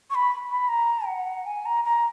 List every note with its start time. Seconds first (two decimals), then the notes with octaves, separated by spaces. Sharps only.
0.10 C#6
0.15 B5
0.50 B5
0.68 A#5
1.07 F#5
1.46 G#5
1.66 A#5
1.85 A#5